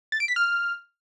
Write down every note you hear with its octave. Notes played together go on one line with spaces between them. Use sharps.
A6
D7
B6
F6